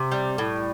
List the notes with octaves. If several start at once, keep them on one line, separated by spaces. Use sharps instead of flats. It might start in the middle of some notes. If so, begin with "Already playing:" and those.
Already playing: C3
G3
A2